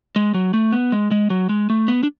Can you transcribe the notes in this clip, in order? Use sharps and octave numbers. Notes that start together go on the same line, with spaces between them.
G#3
F#3
A3
B3
G#3
G#3
F#3
G#3
A3
B3
D4